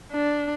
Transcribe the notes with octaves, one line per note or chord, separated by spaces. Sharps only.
D4